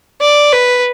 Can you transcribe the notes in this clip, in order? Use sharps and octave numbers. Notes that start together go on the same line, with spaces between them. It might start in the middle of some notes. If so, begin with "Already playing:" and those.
D5
B4